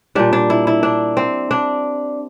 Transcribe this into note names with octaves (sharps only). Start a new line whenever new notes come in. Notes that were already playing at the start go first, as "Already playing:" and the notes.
A#2 G3 D4
D4
E4
E4
D4
C4
D4